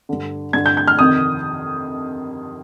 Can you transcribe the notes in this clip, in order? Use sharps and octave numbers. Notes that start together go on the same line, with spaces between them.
G2 D3
G2 D3 G#6
G6
G6
F6
F2 C3 D#3 D#6